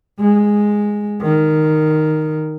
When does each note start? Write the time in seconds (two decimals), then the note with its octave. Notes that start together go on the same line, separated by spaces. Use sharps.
0.20 G#3
1.21 D#3